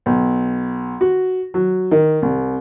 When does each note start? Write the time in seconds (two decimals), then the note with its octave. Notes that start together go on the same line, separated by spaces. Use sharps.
0.06 B1
1.01 F#4
1.54 F#3
1.91 D#3
2.22 C2